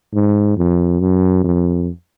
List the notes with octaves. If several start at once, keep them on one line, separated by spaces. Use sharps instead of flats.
G#2
F2
F#2
F2